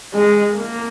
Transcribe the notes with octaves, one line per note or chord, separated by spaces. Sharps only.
G#3
A#3